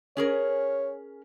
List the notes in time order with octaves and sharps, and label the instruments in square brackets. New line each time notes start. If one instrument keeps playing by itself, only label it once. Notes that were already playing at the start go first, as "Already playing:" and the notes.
[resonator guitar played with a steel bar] C#4 G#4 A#4 [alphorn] C#5